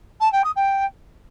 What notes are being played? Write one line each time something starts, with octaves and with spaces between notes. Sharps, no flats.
A5
G5
D#6
G5